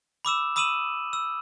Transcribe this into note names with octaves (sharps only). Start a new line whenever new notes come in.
B5 D6 E6 E7
B5 D#6 E6 D#7 E7 F#7
E6